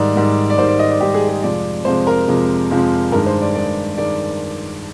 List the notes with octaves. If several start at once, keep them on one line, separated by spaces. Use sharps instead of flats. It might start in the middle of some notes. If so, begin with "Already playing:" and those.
Already playing: G#2 D#3 G3 D5
G#2 D#3 G3
D5
G#2 D#3 G3 C5
D5
D#5
D5
G#2 D#3 G3 G4
G#4
G#4
F2 C3 F3 G#3 D5
F2 C3 F3 G#3 C5
A#4
F2 C3 F3 G#3
F2 C3 F3 G#3
G2 D#3 G#3 A#4
C5
D5
G2 D#3 G#3 D5
D#3 G#3 D5